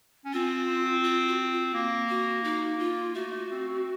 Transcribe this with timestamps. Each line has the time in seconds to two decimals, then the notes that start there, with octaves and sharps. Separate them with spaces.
0.25 C#4
0.33 C4 F4
1.04 F4
1.28 F#4
1.51 F4
1.74 A#3
2.09 F#4
2.44 D#4
2.79 F4
3.15 A3 F#4
3.32 A3
3.51 C4
3.68 C4